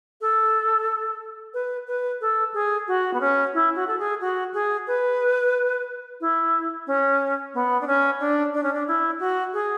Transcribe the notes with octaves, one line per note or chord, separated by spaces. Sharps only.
A4
B4
B4
A4
G#4
F#4
B3
C#4
E4
F#4
A4
G#4
F#4
G#4
B4
E4
C#4
B3
D4
C#4
D4
D4
C#4
D4
E4
F#4
G#4